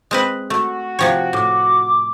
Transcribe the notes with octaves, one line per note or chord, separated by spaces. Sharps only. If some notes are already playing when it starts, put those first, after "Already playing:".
G#3 C4 B4
A3 F#4
C3 F3 C#5 G5
A2 D6